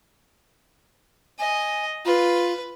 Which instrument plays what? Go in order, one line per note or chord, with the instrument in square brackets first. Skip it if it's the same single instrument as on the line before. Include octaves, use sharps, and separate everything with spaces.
[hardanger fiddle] D#5 [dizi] G#5
[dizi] F4 [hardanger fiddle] B4